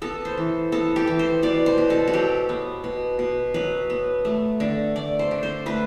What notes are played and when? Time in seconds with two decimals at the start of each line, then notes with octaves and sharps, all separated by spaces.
0.02 B3 A4
0.25 C5
0.37 E3
0.72 B3 A4
0.96 G4
1.07 E3
1.19 C5
1.43 B2 D5
1.66 C5
1.78 B2
1.90 A4
2.07 F#4
2.13 F#3 G4
2.49 B3
2.84 B2
3.19 B2
3.54 F#3 B4
3.90 B3
4.25 A3
4.60 D3
4.96 A3 D5
5.19 C5
5.31 D3
5.43 C5
5.66 A3 B4